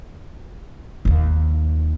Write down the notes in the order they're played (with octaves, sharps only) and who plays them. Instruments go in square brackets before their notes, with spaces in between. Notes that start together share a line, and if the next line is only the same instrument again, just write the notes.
[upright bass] D#2 D#3